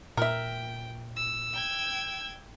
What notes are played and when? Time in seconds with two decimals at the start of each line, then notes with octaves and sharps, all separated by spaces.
0.17 A#2 A#4 E5 G5
1.16 E6
1.53 G5 G#6